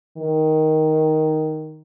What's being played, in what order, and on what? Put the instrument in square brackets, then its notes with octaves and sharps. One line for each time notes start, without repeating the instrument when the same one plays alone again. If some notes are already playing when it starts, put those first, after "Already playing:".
[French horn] D#3